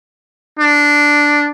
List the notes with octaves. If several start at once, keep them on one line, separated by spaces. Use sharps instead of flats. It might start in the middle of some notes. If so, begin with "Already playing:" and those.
D4